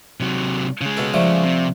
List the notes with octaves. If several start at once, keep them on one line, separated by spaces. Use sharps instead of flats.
C3 F#3
C#3 G#3
B2 A4
F3 G3 A3
C3